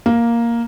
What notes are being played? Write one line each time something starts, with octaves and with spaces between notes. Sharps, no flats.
A#3